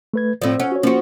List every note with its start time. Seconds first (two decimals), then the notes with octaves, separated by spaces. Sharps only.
0.14 A3 B4 G#6
0.42 A2 F3 C4 D5
0.60 C#4 F#5
0.72 F#4 C#5
0.83 F3 A#3 C#4 F#4